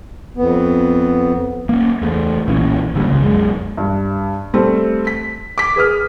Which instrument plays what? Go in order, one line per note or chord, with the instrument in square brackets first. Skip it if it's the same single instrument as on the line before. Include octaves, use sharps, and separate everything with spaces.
[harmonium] F2 B3
[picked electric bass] A#3 C#4
E2 A3
B1 A#2 E3 C#4
G#1 D3 G3 A#3
C#2 C#3
B1 F#2 G#3
[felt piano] G2
G3 A3 C4
B6
D6 B6
G#4 B4 D#6 F6